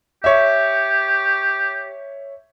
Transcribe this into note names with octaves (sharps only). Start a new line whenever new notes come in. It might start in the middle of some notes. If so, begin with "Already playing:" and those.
G4 C#5 E5